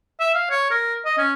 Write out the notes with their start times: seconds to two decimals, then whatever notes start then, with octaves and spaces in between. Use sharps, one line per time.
0.20 E5
0.35 F5
0.50 C#5
0.71 A#4
1.05 D#5
1.18 C#4